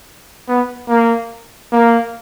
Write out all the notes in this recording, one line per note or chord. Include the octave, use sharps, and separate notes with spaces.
B3
A#3
A#3